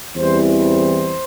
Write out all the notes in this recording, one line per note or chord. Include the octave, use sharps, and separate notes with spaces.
E2 E3 G3 C4 C5
C5